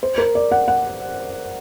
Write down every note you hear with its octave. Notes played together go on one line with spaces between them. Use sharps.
C5
A#4
D5
F#5
F#5